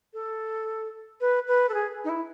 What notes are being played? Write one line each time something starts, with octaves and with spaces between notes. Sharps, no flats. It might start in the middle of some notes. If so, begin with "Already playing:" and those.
A4
B4
B4
A4
G#4
D#4
E4